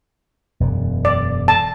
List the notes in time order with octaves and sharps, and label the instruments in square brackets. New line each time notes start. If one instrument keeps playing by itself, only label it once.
[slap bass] E1 F#2
[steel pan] D5
A5